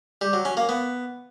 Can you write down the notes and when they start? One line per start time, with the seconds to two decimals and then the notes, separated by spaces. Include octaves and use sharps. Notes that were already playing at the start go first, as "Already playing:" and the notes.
0.21 G3
0.33 F#3
0.45 C#4
0.57 A#3
0.69 B3